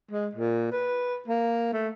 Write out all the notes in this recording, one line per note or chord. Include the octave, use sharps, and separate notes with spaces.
G#3
A#2
B4
A#3
A3